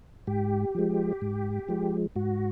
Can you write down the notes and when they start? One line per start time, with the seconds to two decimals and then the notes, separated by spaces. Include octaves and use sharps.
0.27 G#2 G4
0.75 F3 G#3
1.22 G#2
1.69 F3 G#3
2.16 G#2 F#4